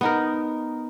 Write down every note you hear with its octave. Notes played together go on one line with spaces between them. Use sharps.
B3 D#4 A#4